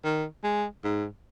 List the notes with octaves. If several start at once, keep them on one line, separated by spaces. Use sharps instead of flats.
D#3
G#3
G#2